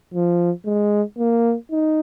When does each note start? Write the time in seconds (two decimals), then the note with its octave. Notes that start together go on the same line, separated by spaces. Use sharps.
0.14 F3
0.66 G#3
1.18 A#3
1.71 D#4